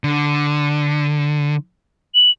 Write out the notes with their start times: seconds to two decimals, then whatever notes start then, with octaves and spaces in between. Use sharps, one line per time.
0.04 D3
2.15 F#7